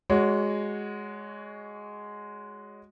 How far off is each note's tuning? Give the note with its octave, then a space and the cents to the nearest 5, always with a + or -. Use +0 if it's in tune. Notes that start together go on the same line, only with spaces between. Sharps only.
G#3 +0 F#4 +0 C#5 +20